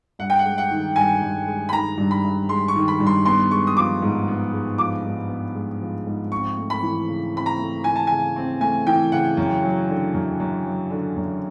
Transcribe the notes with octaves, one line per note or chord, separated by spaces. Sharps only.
G2 F#5
G5
F#5
G#3
F#5
D#3
G2 G#5
G2
G#3
B5
D#3 A#5
G2
B5
G2
G#3 C6
C#6
D#3
B5
G2
C6
B3 C6
G#3 C#6
D#6
F3 D6
G#2
B3
G#3
F3 D6
G#2
B3
G#3
F3
G#2
C4 C#6
A3
B5
E3
C#3
C4 B5
A#5
A3
E3 G#5
A5
C#3 G#5
C4
A3 G#5
E3 G5
C#3 F#5
F#2
F#3
D3
F#2
F#2
F#3
D3
F#2